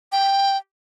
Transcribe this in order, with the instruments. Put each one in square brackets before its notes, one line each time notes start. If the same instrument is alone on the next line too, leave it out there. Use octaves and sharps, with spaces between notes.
[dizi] G5